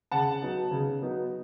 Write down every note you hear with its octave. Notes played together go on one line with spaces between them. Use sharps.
C#3 F#5 A5
F#3 B3 D#4
C#3
F#3 B3 D#4